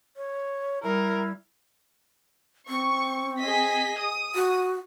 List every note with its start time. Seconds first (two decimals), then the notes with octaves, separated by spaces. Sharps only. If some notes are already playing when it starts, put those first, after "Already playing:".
0.16 C#5
0.83 G3 E4 A#4
2.69 C4 C#6
3.40 G#4 D#5 B6
4.00 D#6
4.35 F#4